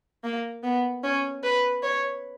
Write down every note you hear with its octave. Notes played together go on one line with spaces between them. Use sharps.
A#3
B3
C#4
B4
C#5